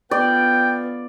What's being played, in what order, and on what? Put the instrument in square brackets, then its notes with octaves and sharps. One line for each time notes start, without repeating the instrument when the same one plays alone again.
[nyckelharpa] B3 F4 [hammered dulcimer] D5 [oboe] G5